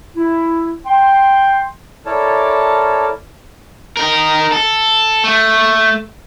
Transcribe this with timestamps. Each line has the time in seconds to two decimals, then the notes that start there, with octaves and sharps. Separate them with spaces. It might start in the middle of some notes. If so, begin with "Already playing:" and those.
0.16 E4
0.86 G5 C6
2.06 E4 A4 A#4 C#5 D5 A5
3.97 D#4 A#4
4.52 A4
5.24 A3